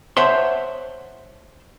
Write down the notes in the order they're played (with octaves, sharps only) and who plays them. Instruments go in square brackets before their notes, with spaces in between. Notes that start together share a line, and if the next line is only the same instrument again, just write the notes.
[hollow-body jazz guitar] C5 C#5 E5 F#5 A5 C6